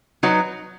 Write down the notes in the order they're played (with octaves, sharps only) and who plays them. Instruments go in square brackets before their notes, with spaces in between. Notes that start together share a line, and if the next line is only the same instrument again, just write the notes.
[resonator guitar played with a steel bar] F#3 D#4 F#4 B4